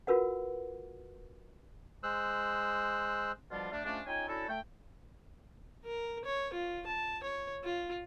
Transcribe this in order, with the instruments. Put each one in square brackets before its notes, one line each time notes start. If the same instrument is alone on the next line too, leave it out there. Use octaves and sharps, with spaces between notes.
[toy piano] F4 F#4 A#4 B4 F#5
[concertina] G#3 C5 E6 F#6
[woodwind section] B2 D3 F3 G3 D4 F4
G3 A3 D4
F3 G#3 A3 C#4 D4
G#3 C#4 D#4 F4 G5 G#5
C#4 D4 E4 F#4 A4
A3 G5
[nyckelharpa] A#4
C#5
F4
A5
C#5
F4